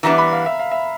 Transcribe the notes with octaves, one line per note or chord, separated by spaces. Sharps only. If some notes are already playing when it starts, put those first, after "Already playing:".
E3 G3 B3 D4 A#5
B5
F5
E5
F5
E5